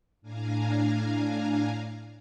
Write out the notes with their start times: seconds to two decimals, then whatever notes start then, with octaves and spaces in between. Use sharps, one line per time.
0.22 A2 D4 F5 G#5 A#5